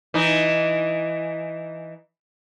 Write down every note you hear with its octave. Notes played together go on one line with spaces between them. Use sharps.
E3 D#4